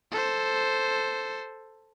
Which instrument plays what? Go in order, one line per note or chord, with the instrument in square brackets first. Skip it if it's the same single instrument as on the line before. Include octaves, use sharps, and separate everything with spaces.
[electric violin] A4 C5